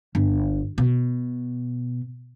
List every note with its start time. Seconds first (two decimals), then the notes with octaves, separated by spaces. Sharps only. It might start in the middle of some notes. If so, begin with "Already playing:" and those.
0.15 G1
0.78 B2